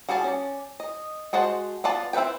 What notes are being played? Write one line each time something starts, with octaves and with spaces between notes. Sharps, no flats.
G3 F#4 G#4 G#5 A5
C#4 D5
D#5
G#3 F#4 C5 F#5 A5
B3 F4 D5 A5
C4 E4 A#4 B4 G5